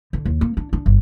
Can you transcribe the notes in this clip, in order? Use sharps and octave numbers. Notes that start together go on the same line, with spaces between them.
D3
D#2
A#3
D4
D4
G1